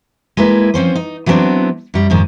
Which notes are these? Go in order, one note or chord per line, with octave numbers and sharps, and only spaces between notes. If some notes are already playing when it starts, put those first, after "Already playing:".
G#3 A#3 E4 B4
F3 C4 C#4 C5
D#4
E3 F#3 G3 B3 C4 D4
F#2 G3
F2 G#2 D#3